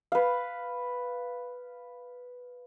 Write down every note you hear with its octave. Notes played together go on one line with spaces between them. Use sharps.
B4 F5